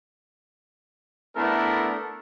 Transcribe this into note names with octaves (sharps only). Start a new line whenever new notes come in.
A3 B3 D4 E4 A4 A#4